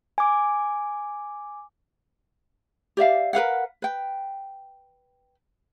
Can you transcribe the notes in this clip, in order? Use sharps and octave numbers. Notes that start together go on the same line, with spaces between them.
G#5 D6
G4 D5 E5 F5
A#4 B4 F5 F#5
B4 G5